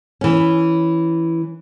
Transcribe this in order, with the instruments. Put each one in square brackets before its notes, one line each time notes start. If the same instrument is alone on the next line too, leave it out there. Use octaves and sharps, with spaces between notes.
[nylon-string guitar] E3 C#4